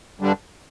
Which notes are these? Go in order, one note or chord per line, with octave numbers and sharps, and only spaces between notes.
G2 D3 G3 D4